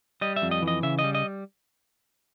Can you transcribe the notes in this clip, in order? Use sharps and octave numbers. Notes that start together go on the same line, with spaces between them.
G3 D#5
E5
F2
D#5
E3
D#5
C#3 E5
D#5
G3
D#5